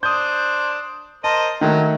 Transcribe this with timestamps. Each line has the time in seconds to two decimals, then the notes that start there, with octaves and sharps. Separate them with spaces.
0.03 D4 C5 D#6 G6
1.24 A#4 C5 D#5 A5
1.61 D#3 F#3 A3